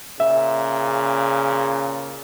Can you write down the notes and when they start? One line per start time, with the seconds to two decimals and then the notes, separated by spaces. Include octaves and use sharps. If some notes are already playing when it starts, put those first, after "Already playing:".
0.20 A#2 C#3 E5